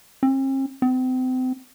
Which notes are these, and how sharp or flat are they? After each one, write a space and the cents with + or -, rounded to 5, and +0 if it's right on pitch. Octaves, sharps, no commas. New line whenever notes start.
C4 +45
C4 -35